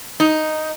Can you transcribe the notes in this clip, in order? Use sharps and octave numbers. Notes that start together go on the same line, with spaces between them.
D#4